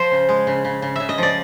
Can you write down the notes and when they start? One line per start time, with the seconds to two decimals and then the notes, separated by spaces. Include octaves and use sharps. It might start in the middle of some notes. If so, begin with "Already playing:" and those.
Already playing: F3 C5
0.12 C#3
0.29 G#3
0.47 C#3
0.65 C#3
0.82 C#3
0.96 C#3 E5
1.09 D#5
1.18 F3 D5